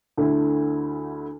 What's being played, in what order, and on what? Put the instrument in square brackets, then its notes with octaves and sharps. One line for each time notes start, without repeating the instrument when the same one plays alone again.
[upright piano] D2 D3 A3 E4